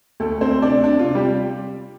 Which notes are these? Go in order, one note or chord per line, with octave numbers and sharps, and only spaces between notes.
D2 A3 A4
D2 C4 C5
C3 D4 D5
C3 D4
F4
C3
G3 G4